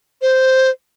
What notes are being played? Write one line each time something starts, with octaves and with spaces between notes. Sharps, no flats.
C5